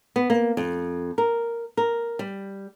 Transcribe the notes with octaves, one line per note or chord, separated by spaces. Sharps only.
B3
A#3
F2
A#4
A#4
G3